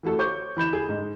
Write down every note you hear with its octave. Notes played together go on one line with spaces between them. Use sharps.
E3 A3 F#4 A4
C5 C#5 C#6 D6 G6
E3 B5 G6 E7
G#4
G#2